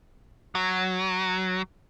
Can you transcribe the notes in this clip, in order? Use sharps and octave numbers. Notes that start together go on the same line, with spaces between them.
F#3